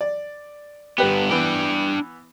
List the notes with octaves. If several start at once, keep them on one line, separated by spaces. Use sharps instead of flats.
D5
G2 B3 G4 B4
E3 B3 D4 G5